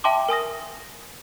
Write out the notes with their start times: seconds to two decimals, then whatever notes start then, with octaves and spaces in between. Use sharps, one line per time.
0.04 E5 G5 A5 C6 D6
0.29 A#4 G#5 D#6 A#6